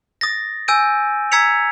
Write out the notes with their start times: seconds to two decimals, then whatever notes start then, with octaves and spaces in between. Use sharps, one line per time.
0.21 D#6 A6 A#6
0.68 G#5 E6 G6 D7 D#7
1.32 A#5 E6 G#6 B6 C#7 F7